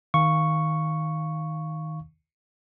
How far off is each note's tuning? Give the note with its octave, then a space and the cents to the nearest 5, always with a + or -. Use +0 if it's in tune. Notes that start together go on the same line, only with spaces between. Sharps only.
D#3 +10 F5 +0 C#6 +0